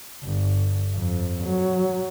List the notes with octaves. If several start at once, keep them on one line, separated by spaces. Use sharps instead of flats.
G1
F2
F#3